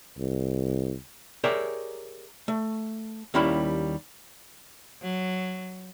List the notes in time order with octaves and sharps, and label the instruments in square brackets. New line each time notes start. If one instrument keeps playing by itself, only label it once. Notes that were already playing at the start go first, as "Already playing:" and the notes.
[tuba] C2
[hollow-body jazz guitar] G4 G#4 A#4 C#5 D5 E5
A3
D#2 G3 A#3 C#4 E4 B5
[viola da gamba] F#3